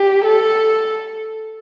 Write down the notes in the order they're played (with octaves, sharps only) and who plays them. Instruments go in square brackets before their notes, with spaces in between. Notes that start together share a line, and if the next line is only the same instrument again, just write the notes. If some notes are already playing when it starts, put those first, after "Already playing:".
Already playing: [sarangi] G4
A4